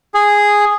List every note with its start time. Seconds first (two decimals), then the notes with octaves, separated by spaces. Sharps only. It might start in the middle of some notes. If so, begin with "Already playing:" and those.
0.14 G#4